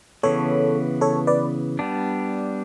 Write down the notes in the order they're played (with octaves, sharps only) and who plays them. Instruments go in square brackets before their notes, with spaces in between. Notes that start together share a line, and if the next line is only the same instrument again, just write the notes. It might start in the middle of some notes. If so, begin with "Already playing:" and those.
[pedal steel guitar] C#3 E3 B3 [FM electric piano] A4 C#5
[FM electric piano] A4 C#5
B4 D5
[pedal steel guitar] G3 B3 D4